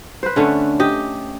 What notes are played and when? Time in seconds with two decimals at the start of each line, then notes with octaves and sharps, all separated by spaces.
0.23 B4 C5
0.36 D3 A3 C#4
0.80 G4 D#5